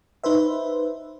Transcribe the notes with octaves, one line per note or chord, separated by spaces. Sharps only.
D#4 B4 C5 E5